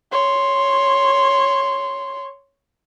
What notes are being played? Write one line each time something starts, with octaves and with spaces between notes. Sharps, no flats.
C#5 C6